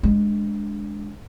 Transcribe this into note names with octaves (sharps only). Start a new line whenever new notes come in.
G#3 D4